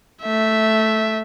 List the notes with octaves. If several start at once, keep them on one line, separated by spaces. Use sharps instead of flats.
A3 E5